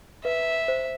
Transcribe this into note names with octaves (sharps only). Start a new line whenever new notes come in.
B4 E5
C5